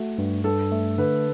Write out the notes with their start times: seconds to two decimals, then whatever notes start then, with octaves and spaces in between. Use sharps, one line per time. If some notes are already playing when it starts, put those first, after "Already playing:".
Already playing: A3 F#4
0.18 G2
0.44 G2 A4
0.72 A3
0.98 D3 B4